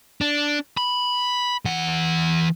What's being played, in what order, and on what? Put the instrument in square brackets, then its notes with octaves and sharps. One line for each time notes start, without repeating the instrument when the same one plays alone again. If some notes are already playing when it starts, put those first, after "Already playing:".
[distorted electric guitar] D4
B5
E3 F#5